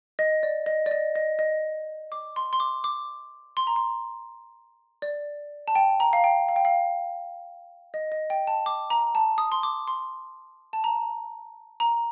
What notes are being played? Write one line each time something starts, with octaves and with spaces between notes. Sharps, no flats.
D#5
D5
D#5
D5
D#5
D#5
D#5
D6
C6
C6
D6
D6
C6
A#5
C6
D5
A5
G5
A#5
F5
G5
F5
G5
F5
D#5
D#5
G5
A5
D6
A#5
A5
D#6
C6
D6
C6
A5
A#5
A#5